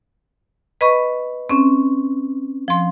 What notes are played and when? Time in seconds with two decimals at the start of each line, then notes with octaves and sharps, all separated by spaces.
0.81 B4 D#5 B5 C#6
1.50 C4 C#4
2.68 F3 C6